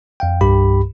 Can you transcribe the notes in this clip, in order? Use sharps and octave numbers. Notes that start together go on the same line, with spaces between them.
F2 F5 G5
C2 G2 G4 B5